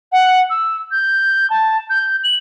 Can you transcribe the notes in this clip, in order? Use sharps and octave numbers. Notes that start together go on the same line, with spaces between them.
F#5
E6
G6
A5
G6
F#7